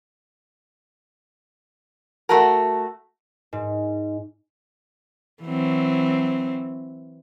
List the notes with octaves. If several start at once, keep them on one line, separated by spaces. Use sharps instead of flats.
A3 F#4 A#4 F#5 A5
G#2
E3 F#3 C4